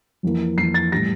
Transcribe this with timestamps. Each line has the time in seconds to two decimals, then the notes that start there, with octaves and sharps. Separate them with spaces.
0.23 F2 E3 A#3
0.57 F2 E3 A#3 C7
0.74 A6
0.92 A2 E3 G3 A#6